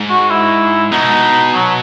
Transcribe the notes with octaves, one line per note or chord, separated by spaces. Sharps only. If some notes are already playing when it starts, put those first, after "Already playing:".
Already playing: G#2
F#4
E4
B2 D#4
F#3